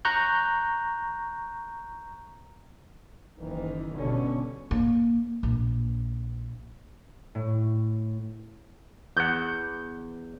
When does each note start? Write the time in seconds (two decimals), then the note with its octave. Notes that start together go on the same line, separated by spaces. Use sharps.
0.05 A#5 C#6 F#6 G6
3.39 F#1 D#3 E3
3.93 G1 B2 D3 C#4
4.71 A#3
5.43 A#1
7.35 A2
9.17 E2 F#5 G6